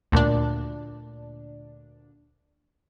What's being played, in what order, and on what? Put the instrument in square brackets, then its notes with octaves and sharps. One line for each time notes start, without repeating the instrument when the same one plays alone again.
[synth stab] D2 A#2 D4